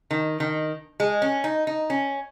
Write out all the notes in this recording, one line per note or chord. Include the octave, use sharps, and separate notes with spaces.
D#3
D#3
G#3
C#4
D#4
D#4
C#4